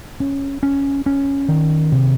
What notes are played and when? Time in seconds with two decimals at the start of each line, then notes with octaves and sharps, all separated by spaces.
0.20 C#4
0.63 C#4
1.06 C#4
1.49 D#3
1.92 C3